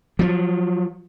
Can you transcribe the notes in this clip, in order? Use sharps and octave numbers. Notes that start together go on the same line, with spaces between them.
F3 F#3